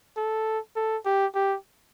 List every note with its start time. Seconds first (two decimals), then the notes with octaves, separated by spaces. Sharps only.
0.17 A4
0.76 A4
1.05 G4
1.35 G4